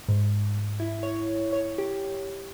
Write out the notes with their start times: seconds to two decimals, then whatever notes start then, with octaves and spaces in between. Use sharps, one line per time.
0.09 G#2
0.80 E4
1.03 C#5
1.53 C#5
1.78 G4